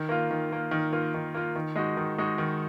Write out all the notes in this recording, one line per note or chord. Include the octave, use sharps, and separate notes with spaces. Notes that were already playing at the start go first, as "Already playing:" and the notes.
Already playing: D#3
A#3 F4
D#3
A#3 F4
D#3
A#3 F4
D#3
A#3 F4
D#3
G#3 D#4 F#4
D#3
G#3 D#4 F#4
D#3